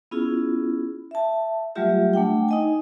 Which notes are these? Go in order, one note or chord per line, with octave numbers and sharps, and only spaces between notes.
B3 C#4 E4 F4 G#4
E5 A5
F#3 G3 A3 F4 G4 E5
A3 D4 F#5 G5
D#4 D#5 G#5